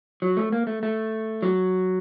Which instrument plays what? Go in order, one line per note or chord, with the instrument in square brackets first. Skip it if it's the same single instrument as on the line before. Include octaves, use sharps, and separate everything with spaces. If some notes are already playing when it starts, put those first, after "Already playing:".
[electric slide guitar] F#3
A3
A#3
A3
A3
F#3